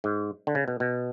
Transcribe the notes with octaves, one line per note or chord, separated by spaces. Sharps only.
G#2
D3
C#3
B2
B2